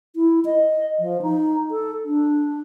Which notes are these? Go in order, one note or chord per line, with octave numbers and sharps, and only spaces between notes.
E4
D#5
F3
D#4
A4
D4